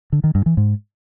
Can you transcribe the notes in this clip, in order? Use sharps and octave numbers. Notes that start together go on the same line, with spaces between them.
D3
D#3
G2
E3
G#2